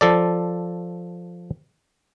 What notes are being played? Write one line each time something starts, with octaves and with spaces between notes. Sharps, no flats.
F3 A4 D5